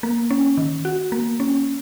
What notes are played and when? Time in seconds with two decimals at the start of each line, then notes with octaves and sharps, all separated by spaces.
0.03 A#3
0.31 C#4
0.57 D#3
0.85 F#4
1.12 A#3
1.40 C#4